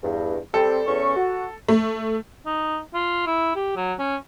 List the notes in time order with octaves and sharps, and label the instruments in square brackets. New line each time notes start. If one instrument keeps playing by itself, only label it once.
[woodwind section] E2 G2
[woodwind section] G3 C4 [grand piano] A4
[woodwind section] E2 C#4 C#6
F#4
[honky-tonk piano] A3
[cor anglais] D#4
F4
E4
G4
F#3
C#4